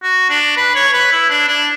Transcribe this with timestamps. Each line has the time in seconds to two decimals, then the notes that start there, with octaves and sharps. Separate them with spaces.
0.03 F#4
0.30 D4
0.57 B4
0.75 C#5
0.94 B4
1.12 E4
1.30 D4
1.48 D4